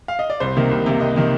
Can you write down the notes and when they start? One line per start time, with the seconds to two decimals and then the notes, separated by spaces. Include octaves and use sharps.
0.08 F5
0.19 D#5
0.30 D5
0.40 C2 C5
0.57 C3 D#3 A#3
0.71 C2
0.86 C3 D#3 A#3
1.01 C2 D#5
1.16 C3 D#3 A#3